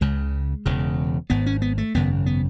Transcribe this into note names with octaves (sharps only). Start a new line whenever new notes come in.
C#2 C#3 G#3
E1 E2 C#3
G#1 G#2 B3
C#4
B3
A3
G#1 F#2 C#3 B3
B3